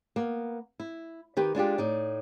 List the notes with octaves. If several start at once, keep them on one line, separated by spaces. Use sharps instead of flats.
A#3 B3
E4
D#3 G4 B4
G#3 D4 F4 G4
A2 D#4 D5